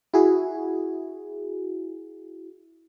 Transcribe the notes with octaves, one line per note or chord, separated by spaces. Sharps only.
E4 F#4 G#4